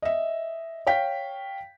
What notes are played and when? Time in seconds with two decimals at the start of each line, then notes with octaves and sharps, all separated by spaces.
0.02 D#5 E5
0.87 C#5 F5 G5 B6